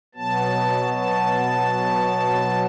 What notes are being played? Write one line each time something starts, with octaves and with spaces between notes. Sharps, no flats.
B2 F#3 B3 A5
A5